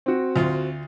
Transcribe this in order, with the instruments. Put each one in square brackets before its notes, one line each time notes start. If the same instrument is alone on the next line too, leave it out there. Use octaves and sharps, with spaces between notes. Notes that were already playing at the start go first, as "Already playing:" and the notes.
[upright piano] C4 F#4
[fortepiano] D2 F4